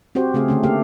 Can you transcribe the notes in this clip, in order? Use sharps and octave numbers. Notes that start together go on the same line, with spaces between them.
C4 F#4 G4 C5
C#3 A3 C4 G#4 F5
D3 A3 C#4
A3 A#3 G4 A4 F5